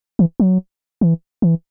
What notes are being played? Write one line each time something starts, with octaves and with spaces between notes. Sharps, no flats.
E3
F#3
E3
E3